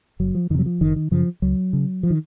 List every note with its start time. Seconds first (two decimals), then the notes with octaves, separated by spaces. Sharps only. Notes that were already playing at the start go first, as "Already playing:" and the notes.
0.20 F#1 F#3
0.35 F3
0.50 F2 D#3
0.55 C3 F#3
0.66 F3
0.81 F#1 D#3
0.96 D#3
1.11 F#2 C#3 F3
1.42 C#2 F#3
1.73 C#3
2.03 F3
2.10 D#3